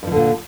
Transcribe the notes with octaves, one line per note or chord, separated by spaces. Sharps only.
G2 A#2 D3 F3